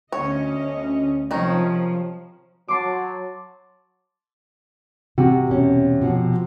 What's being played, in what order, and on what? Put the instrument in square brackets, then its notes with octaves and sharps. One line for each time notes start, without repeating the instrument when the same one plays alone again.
[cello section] D2 C#4 D#5 [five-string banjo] C#5
[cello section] C3 F3 [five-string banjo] D#3 C#4 D#4
[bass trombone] F#3 [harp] A5 C6 D6
[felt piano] C3 [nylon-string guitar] F#4
[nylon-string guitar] E2 B2 C#4
B2 F3 F#4